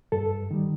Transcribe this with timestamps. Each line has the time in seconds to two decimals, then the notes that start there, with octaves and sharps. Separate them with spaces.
0.12 G2 A4
0.51 D#3 G3